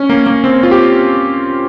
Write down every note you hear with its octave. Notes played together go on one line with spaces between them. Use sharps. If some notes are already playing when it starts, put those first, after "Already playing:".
Already playing: C#4
A#3
A#3
C4
F4
G4